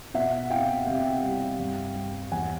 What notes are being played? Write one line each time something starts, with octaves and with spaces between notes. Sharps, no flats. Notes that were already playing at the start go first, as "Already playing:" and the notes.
B2 E5 F#5
C4 F5 G5
C3
G3
G2
G3
E2 F#5 G#5